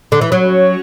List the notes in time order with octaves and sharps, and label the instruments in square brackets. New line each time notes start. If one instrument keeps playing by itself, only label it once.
[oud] D3
E3
[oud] F#3 [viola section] C#4 F#4 C#5